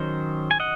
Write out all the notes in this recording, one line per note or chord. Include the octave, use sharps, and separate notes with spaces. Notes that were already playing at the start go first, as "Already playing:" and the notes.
Already playing: D#3 F#3 C#4 C5 D#5
G#5
D#5 F#5